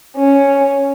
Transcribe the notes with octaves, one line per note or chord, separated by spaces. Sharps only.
C#4